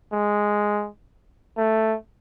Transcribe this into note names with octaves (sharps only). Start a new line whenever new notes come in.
G#3
A3